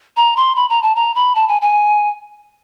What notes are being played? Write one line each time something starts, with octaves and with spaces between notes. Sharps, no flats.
A#5
C6
B5
A#5
A5
A#5
B5
A5
G#5
G#5